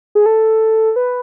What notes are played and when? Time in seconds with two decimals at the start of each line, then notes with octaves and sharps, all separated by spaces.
0.15 G#4
0.26 A4
0.96 B4